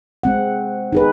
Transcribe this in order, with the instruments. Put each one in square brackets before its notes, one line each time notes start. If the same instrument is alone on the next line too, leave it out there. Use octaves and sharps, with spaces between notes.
[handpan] G#3 C4 F#5
D#4 G#4 B4